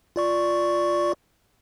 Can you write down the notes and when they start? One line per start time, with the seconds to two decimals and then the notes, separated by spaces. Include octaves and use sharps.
0.16 F4 D5 C#6